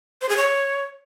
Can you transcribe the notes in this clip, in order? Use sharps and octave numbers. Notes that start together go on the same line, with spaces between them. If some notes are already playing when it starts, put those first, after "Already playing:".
C5
G#4
C#5